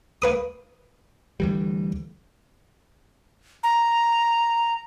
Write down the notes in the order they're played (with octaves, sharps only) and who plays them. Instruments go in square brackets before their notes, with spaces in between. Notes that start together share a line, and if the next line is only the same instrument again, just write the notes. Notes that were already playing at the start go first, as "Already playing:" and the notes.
[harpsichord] A#3 B4 D#6
[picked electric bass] D2 E3 G3
[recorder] A#5